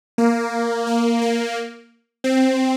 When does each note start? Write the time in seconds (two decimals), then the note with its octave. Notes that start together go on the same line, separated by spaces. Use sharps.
0.18 A#3
0.87 A#3
1.22 A#3
2.24 C4